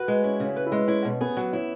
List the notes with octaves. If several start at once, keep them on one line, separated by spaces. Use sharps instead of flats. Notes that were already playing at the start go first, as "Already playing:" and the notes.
Already playing: F#4 B4
G#3
C#4 E4
C#3 C#4
B4
E4
G#3
C#4 E4
B2
B3 G#4
F#3
C#4 E4